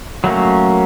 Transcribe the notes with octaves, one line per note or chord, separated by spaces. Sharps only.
F#3 A3 A#3 C#4